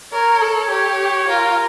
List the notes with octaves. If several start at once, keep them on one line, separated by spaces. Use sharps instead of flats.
A#4 C#5
A4
G4 C#5
F4 A#4